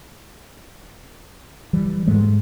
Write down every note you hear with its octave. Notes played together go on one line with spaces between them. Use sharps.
E3 G3
G#2 G#3 A3